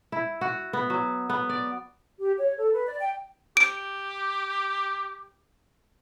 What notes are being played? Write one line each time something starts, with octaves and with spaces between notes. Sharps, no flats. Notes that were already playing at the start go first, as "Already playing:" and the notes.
E4
F#4
B3
F#3
B3
D5
G4
C#5
A4
B4
D5
G5
G4 D7